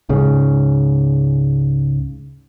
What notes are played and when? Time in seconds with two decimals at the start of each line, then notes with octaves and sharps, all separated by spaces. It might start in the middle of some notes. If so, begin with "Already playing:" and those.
0.09 C#2 G#2 C#3